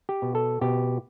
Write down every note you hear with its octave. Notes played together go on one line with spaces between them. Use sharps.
G4
B2
A4
B2 G4